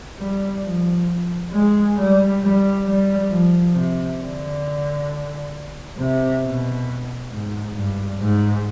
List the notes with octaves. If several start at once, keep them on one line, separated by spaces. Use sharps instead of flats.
G3
F3
G#3
G3
G3
G3
F3
C3
D3
C3
B2
G#2
G2
G#2